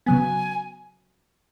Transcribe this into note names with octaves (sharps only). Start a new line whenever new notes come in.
C#3 F#3 B3 G#5